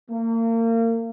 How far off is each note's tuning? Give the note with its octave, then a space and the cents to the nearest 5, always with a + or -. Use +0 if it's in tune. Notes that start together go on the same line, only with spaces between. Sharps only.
A#3 -35